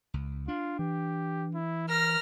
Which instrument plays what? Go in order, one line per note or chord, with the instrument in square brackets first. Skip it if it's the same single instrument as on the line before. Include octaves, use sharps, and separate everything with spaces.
[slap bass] C#2
[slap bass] D4 [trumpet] F4
[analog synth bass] E3 [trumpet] G4
[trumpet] E4
[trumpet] A#4 [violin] F6 A#6